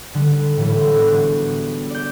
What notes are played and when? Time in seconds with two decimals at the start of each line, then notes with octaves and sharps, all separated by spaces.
0.14 D3 G3
0.57 A2 E3 G3
0.93 G#3 B3 D4 F#4 G4
1.90 D5 G6